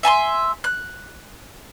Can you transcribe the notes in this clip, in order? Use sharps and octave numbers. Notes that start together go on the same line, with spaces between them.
E5 G#5 A5 C6
F#6